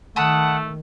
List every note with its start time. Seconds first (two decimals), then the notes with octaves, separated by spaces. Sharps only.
0.16 D#3 A3 F#5 A5 B5 D#6